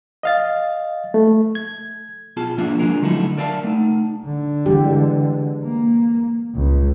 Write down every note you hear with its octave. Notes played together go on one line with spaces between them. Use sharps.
D#5 F5 A6
A3
G#6
B2 F4 G#4 A5
G#2 F3 A#3 D4 F4 E5
F3 G#3 A#3 D4 G#4 A#4
D3 F#3 A3 D#4 E4 A4
A#4 D5 E5 F5 A5
A3 D#4
D3
E3 G#3 G4
A#3
C#2